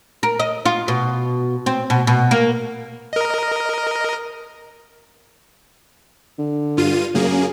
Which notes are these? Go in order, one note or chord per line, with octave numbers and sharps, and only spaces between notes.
A#4
D#5
F4
B2
C4
B2
B2
A#3
A#4 D#5
D3
G2 F4 D#7
F#2 C#3 A#3 G#4